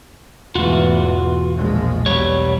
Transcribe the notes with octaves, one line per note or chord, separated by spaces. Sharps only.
E1 E2 G#2 E3 A3 F4 F#4
A#1 F3 G#3
B1 B2 G3 C#5